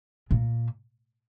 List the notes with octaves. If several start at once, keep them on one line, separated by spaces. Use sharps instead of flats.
A#2